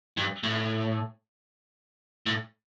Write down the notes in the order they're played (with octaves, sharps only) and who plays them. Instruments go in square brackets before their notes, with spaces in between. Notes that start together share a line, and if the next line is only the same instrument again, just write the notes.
[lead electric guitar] G2
A2
A2